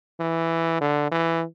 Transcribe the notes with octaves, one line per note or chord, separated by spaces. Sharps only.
E3
D3
E3